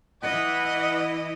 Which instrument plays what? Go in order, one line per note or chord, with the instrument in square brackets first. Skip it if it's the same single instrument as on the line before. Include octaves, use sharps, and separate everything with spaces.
[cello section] E3 E4 D#5 [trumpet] F#5